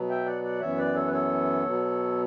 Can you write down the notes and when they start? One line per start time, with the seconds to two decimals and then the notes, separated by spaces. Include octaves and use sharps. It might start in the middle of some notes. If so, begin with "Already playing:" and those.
Already playing: B2 F#3 B3
0.09 E5 G5
0.25 D5 F#5
0.43 D5 F#5
0.60 F#2 E3 B3 C#5 E5
0.78 B4 D5
0.95 A4 C#5
1.07 B4
1.13 A4 C#5
1.65 B2 F#3 B3